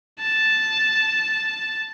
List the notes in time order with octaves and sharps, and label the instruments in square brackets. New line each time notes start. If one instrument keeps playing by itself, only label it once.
[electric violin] A5